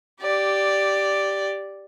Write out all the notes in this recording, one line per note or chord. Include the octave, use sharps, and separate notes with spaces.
G4 D5